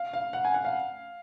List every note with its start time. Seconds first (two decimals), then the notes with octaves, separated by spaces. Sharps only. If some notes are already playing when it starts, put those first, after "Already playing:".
Already playing: F5
0.13 F5
0.33 F#5
0.44 G#5
0.54 F#5
0.65 F5